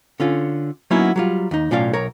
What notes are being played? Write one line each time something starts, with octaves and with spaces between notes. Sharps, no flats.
D3 C#4 F4
F#3 A#3 B3 C#4 D#4 E4
F#3 G3 F4
D#2 D#4
B1 A2 C#4 F4 D5 F5
B1 A#4 C#5